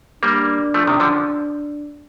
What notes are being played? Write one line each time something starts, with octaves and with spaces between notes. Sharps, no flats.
G3 A#3 D4
F3 A3
C3 D#3
D3 F3